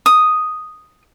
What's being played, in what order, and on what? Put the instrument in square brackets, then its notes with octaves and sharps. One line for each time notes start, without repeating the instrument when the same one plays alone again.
[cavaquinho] D#6